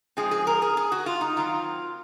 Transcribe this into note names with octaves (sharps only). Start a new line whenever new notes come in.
F3 G#3 C4 G#4
G#4
A#4
G#4
G#4
F#4
F4
D#4
D#3 F#3 C4 F4